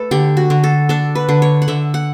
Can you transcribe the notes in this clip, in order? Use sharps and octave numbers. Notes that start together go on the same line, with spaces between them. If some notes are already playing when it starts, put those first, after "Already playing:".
Already playing: A3 A4 B4
D3 G4
F#4
D3
A4
D4 A4
B4
D3
C#5
F#5
D3 E5
F#5